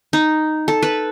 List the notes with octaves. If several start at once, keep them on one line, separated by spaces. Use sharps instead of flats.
D#4
A4
B4